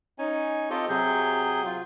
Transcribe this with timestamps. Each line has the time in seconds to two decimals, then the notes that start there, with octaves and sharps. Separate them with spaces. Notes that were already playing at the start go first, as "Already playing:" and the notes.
0.19 C#4 D#4 G#5
0.70 C4 F4 G4 A4 D#5
0.89 C3 F#3 G#4 G6
1.66 F4